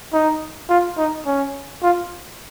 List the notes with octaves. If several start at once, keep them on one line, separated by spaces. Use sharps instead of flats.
D#4
F4
D#4
C#4
F4